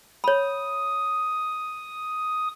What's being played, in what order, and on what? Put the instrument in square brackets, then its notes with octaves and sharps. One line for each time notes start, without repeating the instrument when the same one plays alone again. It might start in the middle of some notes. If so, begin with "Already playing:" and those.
[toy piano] C#5 B5 [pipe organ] D#6